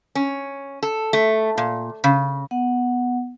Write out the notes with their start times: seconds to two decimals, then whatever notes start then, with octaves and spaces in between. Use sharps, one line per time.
0.15 C#4
0.83 A4
1.13 A3
1.58 A#2
2.04 C#3
2.51 B3 F#5